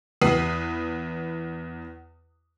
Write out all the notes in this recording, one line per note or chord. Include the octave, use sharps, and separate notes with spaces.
E2 B4 D#6 C7 F#7